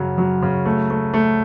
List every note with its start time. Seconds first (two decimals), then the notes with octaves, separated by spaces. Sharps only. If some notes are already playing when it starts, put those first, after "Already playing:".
Already playing: F#2 C#3 F#3
0.18 F#3
0.42 C#3
0.65 A3
0.90 A3
1.14 A3